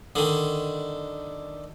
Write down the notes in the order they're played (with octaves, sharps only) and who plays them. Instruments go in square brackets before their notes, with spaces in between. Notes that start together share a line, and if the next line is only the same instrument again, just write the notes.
[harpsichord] D3 D#3